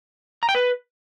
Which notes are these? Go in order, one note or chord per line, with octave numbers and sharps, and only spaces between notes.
A#5
G5
B4